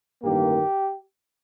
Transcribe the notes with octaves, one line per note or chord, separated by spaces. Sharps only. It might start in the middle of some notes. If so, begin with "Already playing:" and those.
A1 G2 D#3 A#3 G4